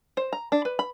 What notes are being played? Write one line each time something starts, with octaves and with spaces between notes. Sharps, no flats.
C5
A#5
D4
B4
B5